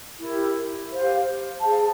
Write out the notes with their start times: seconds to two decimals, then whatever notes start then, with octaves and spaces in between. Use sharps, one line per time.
0.20 E4 G4 A#4
0.91 G4 C5 F5
1.60 G#4 C5 F5 A5